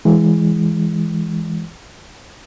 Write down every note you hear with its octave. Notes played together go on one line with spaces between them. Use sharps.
E3 G#3